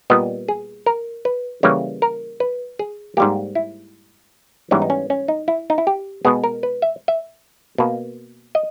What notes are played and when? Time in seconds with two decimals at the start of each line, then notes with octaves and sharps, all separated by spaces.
0.10 A#2 G3 B3 D#5
0.48 G#4
0.86 A#4
1.25 B4
1.63 C#3 E3 G3 A#3 C#5
2.02 A#4
2.40 B4
2.79 G#4
3.17 G#2 G3 A#3 G4
3.55 E4
4.71 G#2 E3 G3 B3 C#4
4.82 D#4
4.90 C#4
5.10 C#4
5.28 D#4
5.48 E4
5.70 D#4
5.78 E4
5.87 G4
6.25 B2 G#3 B3 G#4
6.44 A#4
6.63 B4
6.82 E5
7.08 E5
7.78 B2 A#3
8.55 D#5